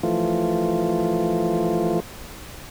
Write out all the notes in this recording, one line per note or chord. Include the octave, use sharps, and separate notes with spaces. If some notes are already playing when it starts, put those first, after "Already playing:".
E3 F3 A3 F4